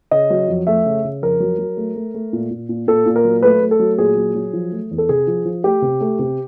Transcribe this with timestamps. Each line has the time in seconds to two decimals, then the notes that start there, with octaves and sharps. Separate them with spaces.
0.11 C#3 D#5
0.30 F#3
0.48 F2
0.67 A3 E5
0.86 C#3
1.05 C#3
1.23 F2 A#4
1.40 F#3
1.59 F#3
1.77 A3
1.96 A3
2.14 A3
2.33 A#2
2.51 A#2
2.69 A#2
2.88 A#2 A4
3.06 A#2
3.16 A#4
3.25 F#3
3.43 A3 B4
3.62 A3
3.71 A4
3.79 F#3
3.98 A#2 G#4
4.16 F#3
4.35 F#3
4.53 F3
4.71 A3
4.91 E2
4.98 A4
5.09 C3 G#4
5.27 F3
5.45 F3
5.64 A3 G4
5.82 C3
6.01 A3
6.19 C3